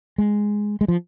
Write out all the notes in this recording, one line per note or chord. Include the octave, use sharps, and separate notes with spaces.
G#3
G#3
F3